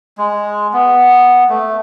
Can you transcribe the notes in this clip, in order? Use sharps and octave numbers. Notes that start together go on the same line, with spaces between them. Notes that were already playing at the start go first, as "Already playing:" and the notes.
G#3
B3
A3